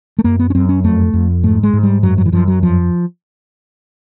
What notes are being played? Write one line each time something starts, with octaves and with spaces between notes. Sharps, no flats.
A3
F#2 A#3
B3
C#4
F#2 C4
C#4
F2 A3
F2
G#2 A3
G#3
G#2
G3
F#2 F#3
F#3
E3
F#2 F3
F#3
F2 F3